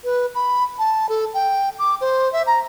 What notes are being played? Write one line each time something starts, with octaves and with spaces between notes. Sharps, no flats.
B4
B5
A5
A4
G5
D6
C5
E5
A#5